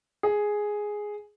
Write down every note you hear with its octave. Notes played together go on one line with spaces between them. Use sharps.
G#4